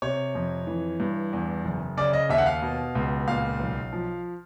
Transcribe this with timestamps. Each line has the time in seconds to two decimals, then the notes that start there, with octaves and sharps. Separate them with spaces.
0.02 C3 C#5
0.35 F2
0.67 E3
1.00 G2
1.33 E2
1.65 F#1
1.97 C#3 D5
2.13 D#5
2.29 D#2 E5
2.38 F#5
2.46 F5
2.62 B2
2.95 C#2
3.28 A#2 F5
3.60 B1
3.93 F3